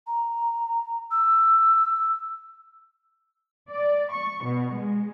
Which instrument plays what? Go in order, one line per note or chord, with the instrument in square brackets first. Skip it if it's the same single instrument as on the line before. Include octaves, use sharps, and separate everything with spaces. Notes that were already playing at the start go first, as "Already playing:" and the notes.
[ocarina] A#5
E6
[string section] D5
C#6
B2
G#3